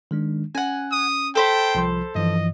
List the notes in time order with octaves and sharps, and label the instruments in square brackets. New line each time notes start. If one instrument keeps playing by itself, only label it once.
[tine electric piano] D#3 G#3 D4
[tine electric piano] C#4 [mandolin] F#5 G#5
[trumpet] D#6
[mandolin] A4 C5 B5 [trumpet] G5
[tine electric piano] C2 F3 C6
[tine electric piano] G2 E3 F3 [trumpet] D#5